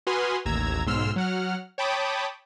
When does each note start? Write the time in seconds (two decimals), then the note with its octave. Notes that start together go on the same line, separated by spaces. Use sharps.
0.07 F#4 B4 G#5 C6 D#6 F6
0.45 A1 D#2 A#5 E6 G#6
0.86 B1 G#2 C6 E6 F6
1.16 F#3 F#5 F6
1.78 C#5 G5 A5 B5 D6 D#6